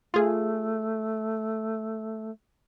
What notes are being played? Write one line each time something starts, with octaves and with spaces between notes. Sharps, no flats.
A3 F4 G#4